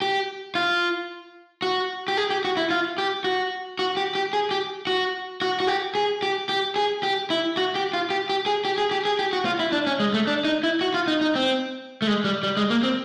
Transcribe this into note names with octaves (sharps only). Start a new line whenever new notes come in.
G4
F4
F#4
G4
G#4
G4
F#4
E4
F4
G4
F#4
F#4
G4
G4
G#4
G4
F#4
F#4
F#4
G4
G#4
G4
G4
G#4
G4
E4
F#4
G4
F4
G4
G4
G#4
G4
G#4
G4
G#4
G4
F#4
F4
E4
D4
C#4
G#3
A3
D4
D#4
E4
F#4
F4
D#4
D#4
C4
A3
G#3
G3
G3
G#3
A#3
C4